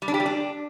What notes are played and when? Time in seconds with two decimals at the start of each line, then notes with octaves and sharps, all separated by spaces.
0.02 G3
0.08 D4
0.14 G4
0.20 G3
0.26 D4